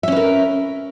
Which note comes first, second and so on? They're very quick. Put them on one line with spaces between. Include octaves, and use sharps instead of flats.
E5 C#4 B4 A#4